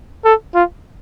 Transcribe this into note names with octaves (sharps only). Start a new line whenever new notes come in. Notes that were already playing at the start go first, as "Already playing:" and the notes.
A4
F4